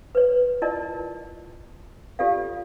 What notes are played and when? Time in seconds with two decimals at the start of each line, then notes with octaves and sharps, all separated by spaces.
0.15 B4 C#5
0.62 E4 F4 A#4 D5 D#5 A5
2.19 F4 G4 A4 D5 F5